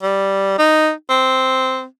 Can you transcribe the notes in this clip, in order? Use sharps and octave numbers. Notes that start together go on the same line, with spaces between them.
G3
D#4
C4